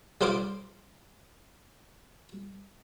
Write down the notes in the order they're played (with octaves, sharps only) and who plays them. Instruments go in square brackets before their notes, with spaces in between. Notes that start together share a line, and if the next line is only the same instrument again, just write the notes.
[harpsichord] G3 F4 C5 F5 D6